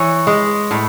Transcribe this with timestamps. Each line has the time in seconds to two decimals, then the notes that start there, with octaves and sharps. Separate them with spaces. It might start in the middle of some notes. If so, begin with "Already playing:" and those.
Already playing: E3 C#5
0.27 G#3
0.71 A2